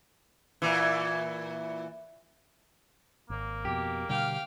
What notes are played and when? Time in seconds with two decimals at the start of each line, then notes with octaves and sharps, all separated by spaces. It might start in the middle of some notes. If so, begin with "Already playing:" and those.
0.62 A#2 E3
3.30 G#1 A#3
3.65 F2 B2 G4
4.09 B2 D3 G3 F5 G5